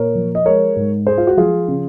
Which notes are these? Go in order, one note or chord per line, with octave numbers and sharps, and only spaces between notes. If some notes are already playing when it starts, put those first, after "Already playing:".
Already playing: A#2 A#4 C#5
F3
D#5
G#3 A#4 C#5
G#2
G#3 G#4 C5
F4
F#4
F3 F4 G#4
C#3